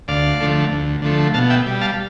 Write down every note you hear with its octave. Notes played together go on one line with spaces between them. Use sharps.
D2 D5 F5
D3 F3 A3
D2
D3 F3 A3
B2 F5 A5
E5 G5
G3
F5 A5